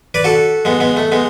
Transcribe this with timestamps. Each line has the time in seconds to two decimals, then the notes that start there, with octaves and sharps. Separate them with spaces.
0.14 B4 D5
0.24 F#4 A4
0.65 G#3 B3
0.80 G#3 B3
0.97 A3
1.12 G#3 B3